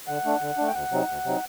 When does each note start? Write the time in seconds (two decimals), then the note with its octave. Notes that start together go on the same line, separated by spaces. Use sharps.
0.08 D3 F#5
0.25 A3 D4
0.41 D3
0.58 A3 D4
0.67 G5
0.74 D2 F#5
0.91 C3 F#3 C4 D#4
1.08 D2
1.24 C3 F#3 C4 D#4